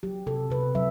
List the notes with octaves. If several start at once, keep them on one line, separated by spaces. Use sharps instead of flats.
F#3 G4
C3 A4
C3 B4
F#3 E5